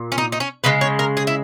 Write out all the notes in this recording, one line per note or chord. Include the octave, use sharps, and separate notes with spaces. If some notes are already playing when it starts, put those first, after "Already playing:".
Already playing: A#2
C#4
D#4
D#4
C#4
C#3 G#3 B4
C#5
A#4
G#4
E4